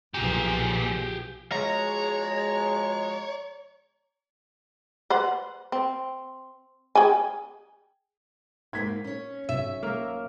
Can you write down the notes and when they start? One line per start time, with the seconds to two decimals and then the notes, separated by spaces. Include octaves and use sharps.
0.14 B1 A#2 F3 G4 G#4
1.52 B2 F3 G#3 C#5 A#5
5.10 B4 C5 F#5
5.72 C4
6.95 G#4 G5 G#5
8.73 G#2 A#3 D#4 G#6 B6
9.04 C#4 C#5
9.49 B1 E5
9.83 A#3 A#4